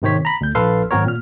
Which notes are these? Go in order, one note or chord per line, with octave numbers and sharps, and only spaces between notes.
G#1 C3 D#3 C5 C#5 B6
A#5 B5
D2 G6
A#1 A4 B4 F5 C6
G#1 F#3 C4 F#4 A#4 C#5
A#2 F6